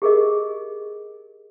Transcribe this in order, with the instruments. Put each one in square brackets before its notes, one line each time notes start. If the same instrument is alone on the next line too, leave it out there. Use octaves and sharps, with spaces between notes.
[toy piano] G4 G#4 A#4 D#5